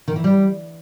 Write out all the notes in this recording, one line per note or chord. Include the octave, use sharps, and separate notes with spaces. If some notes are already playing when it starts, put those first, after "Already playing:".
D#3
E3
G3